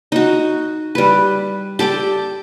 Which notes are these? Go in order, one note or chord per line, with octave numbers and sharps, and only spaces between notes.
D#4 F#4
G3 B4
G4 A4 D5 G5